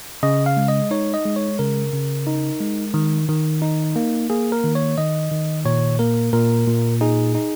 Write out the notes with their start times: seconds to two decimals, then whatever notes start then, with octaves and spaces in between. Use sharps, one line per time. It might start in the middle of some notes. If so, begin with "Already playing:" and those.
0.23 C#3 D#5
0.46 F5
0.57 G#3
0.68 D#5
0.91 D#4 C#5
1.14 D#5
1.25 G#3
1.36 C#5
1.59 C#3 A#4
1.93 C#3
2.27 D#4
2.60 G#3
2.94 D#3
3.29 D#3
3.62 D#4
3.96 A#3
4.30 A#3 G#4
4.52 A#4
4.64 D#3
4.75 C#5
4.98 D#3 D#5
5.32 D#3
5.65 A#2 C#5
5.99 A#3 A#4
6.33 A#2 A#4
6.68 A#2
7.01 D#4 G#4
7.35 D#4